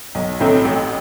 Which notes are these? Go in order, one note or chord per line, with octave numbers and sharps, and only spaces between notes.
B1
A2 F#3 A3 C4
A1